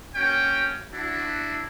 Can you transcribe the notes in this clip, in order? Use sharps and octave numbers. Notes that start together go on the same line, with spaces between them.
A#3 C#4 F#4 G5
D4 E4 F#4